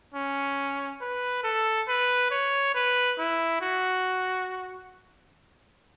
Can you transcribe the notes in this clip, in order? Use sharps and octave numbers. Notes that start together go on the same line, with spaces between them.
C#4
B4
A4
B4
C#5
B4
E4
F#4